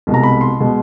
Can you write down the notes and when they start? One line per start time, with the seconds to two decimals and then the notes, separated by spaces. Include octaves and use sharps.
0.07 C2 B2 G#3
0.14 A#5
0.23 B5
0.41 C6
0.60 B2 G#3